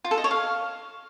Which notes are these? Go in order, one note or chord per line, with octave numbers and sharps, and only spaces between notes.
F4
A4
D#5
C#5
F5